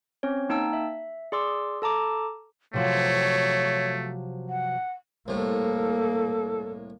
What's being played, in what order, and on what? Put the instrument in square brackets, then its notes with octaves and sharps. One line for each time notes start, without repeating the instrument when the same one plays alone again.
[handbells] C4 C#4 C#5
A#3 D#4 G5 A5 E6
E5
G#4 D5 C6 D6 E6
A4 A5 A#5 D6
[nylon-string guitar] C3 F3 F#3 [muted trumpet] A3 [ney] C#5
[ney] F#5
[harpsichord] C2 A2 [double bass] A#3 [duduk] A4